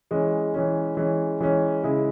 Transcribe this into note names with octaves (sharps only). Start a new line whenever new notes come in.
E3 G#3 C#4
E3 G#3 C#4
E3 G#3 C#4
E3 G#3 C#4
C#3 G#3 E4